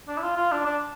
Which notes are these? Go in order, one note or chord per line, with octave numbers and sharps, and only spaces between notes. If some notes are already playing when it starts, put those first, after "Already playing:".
D4
E4
F4
F4
D4
D4